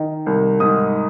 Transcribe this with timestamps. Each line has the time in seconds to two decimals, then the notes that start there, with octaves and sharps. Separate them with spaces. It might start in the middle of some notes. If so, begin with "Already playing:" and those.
Already playing: D#3
0.26 C2
0.60 G#2 D#6